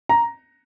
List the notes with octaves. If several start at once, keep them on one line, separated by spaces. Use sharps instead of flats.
A#5